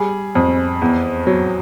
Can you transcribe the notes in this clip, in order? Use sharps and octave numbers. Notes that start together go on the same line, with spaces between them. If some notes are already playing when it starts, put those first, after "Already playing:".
Already playing: G3 G#4
F2
E2
F#3